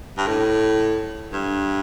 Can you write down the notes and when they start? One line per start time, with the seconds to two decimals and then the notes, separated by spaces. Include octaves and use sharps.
0.17 G2
0.27 A2
1.32 G2